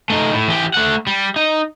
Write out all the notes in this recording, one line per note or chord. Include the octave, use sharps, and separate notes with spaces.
A3 D#4
A2
E3 G4
A3 F#5
G3
D#4